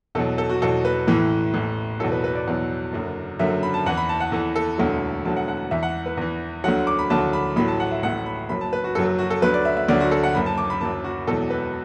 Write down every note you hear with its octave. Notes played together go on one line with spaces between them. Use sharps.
E2 B2 F#3 A4
A4
F#4
E2 B2 F#3 A4
B4
A1 A2 E3
A1 A2 E3
E2 B2 F#3 A4
B4
B4
D5
E2 B2 F#3
F#1 F#2 D3 F#3
F#1 F#2 D3 F#3 E5
B5
A5
E2 E3 F#5
B5
A5
F#5
E2 E3 A4
A4
E1 D2 D3 F#3
E1 D2 D3 F#3 A5
F#5
F#5
E2 E3 E5
F#5
B4
E2 E3
D2 D3 F#3 F#5
D6
B5
D2 D3 F#3 A5
B5
A1 A2 F#3 B5
A5
F#5
E5
A1 A2 F#3 F#5
B5
F#1 F#2 F#3 B5
A5
B4
F#4
F#1 F#2 F#3 A4
A4
F#4
A4
D2 D3 F#3 B4
D5
E5
E5
D2 D3 F#3 D5
F#4
A4
F#5
F#1 F#2 F#3 B5
A5
D6
B5
F#1 F#2 F#3 A5
F#4
E1 E2 B2 F#3 A4
B4